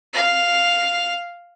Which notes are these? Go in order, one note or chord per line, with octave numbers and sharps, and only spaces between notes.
F5